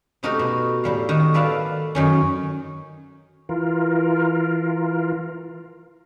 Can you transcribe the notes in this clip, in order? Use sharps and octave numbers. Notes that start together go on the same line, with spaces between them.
C3 A3 D#4 F#4 G4 A#4
B2
A2 G3 F5
D#3 F#4
A4 B4 D5 F5 A5
F#2 D#3 C#4
E3 F4 A#4